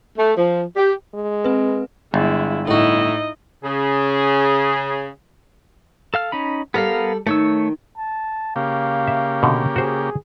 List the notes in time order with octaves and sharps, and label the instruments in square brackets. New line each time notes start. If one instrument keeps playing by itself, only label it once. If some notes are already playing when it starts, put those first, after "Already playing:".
[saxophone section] A3
F3
G4
[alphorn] G#3
[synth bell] C4 B4
[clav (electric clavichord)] G1 [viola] G#3 E4
[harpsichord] A2 F#4 [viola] D#4 E4 [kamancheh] D#5
[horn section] C#3 G#4
[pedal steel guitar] A4 F5 F6
C#4 D#4 B5
[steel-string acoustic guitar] G3 A4 [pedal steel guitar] B3 A#4 F5
[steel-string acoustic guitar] D#3 [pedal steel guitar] A3 C#5 E6
[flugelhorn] A5
[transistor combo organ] C#3 A#3 G4 [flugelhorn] F5
[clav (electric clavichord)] E5
B2 D3
[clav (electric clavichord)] F#4 C5 [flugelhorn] G#4